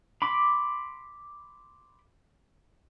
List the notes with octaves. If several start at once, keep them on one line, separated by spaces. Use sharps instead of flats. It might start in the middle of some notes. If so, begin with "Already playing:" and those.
B5 C6 D6